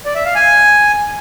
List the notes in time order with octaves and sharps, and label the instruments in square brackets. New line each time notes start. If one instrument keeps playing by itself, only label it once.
[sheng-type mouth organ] D5
E5
F5
G#5